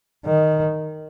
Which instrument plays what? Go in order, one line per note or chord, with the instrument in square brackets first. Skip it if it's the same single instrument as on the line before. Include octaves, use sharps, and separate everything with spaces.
[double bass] D#3